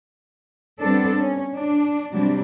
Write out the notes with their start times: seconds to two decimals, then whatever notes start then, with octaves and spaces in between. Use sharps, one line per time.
0.79 G3 B3 C4 D4 A4
1.19 C#4
1.55 D4
2.13 C3 F#3 G3 D4